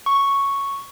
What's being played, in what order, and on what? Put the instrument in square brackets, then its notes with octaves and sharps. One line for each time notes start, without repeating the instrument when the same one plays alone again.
[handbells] C#6